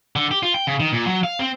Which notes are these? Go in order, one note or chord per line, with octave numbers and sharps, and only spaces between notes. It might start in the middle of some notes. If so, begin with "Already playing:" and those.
D3
G4
F4
G5
C#3
D#3
A#2
F#3
F5
C4